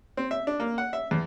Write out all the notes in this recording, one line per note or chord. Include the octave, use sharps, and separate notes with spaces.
C4
E5
D4
A#3
F#5
E5
E2